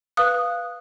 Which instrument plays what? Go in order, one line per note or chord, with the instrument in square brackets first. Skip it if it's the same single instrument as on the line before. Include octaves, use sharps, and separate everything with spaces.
[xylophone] B4 F5 D#6 F#6